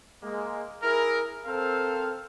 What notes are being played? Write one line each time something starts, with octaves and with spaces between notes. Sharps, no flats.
G#3 A#3
E4 G#4 A#4
C4 A4 A#4 C5 F5